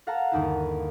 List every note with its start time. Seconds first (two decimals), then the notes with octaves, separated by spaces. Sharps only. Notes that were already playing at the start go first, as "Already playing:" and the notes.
0.07 A4 F5 F#5 A5 A#5
0.32 G1 D#2 D#4 E4